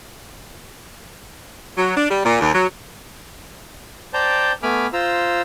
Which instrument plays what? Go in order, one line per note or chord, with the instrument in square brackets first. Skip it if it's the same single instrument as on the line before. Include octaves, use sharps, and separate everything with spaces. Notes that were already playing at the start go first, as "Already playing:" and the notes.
[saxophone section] F#3
D4
G3
A#2
D#2
F#3
[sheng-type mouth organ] C5 D5 G5 A5 A#5 G6
A3 B3 G#5 B5 D6 F6
F4 C5 A#5 E6